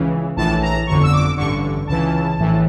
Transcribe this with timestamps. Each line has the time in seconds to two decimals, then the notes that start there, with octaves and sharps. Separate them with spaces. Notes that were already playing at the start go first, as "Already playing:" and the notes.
Already playing: C#2 C#3 E3
0.37 A#1 A2 E3 A5
0.62 A#5
0.87 G1 F2 D3 C#6
1.03 E6
1.12 D6
1.37 A1 G2 D3 C#6
1.87 C#2 C#3 E3 A5
2.38 A#1 A2 E3